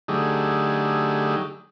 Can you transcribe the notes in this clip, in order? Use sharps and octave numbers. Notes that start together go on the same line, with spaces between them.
D3 F#3 A3 D#4 G4 G#4